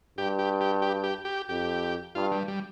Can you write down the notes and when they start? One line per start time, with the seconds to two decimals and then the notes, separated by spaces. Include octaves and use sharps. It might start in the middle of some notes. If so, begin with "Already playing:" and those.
0.18 G2 G4
0.39 G4
0.61 G4
0.82 G4
1.04 G4
1.25 G4
1.49 F2 G4
2.15 G2 F4
2.32 G3
2.48 G3